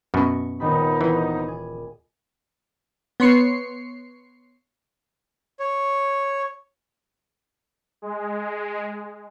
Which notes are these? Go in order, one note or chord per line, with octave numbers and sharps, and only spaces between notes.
F#2 B2 C#6
D#1 C3 B3 D#4 B5
E3
G#4
B3 C#5 C6 C7 C#7
C#5
G#3